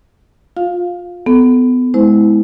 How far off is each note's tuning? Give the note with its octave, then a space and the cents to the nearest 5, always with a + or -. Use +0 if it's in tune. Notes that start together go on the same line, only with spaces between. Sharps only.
F4 +20 F5 +0
B3 +25 A4 -10
G#3 +20 E4 -25 C5 -30